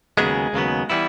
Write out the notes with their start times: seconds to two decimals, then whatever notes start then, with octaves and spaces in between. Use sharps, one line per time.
0.17 D#2 C#3 F#3 G#3 B3 G#4
0.53 D#2 C#3 F#3 B3
0.90 E3 G3 B3 E4